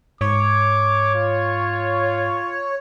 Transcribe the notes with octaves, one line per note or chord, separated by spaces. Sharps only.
G#2 C#5 D6
F4